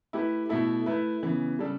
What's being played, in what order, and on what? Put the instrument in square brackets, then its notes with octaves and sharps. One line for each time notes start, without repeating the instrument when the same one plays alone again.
[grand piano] A3 E4 G4 B4
B2 A3 E4 A4
A3 E4 B4
C#3 E3 B3
C#3 G3 D4 A4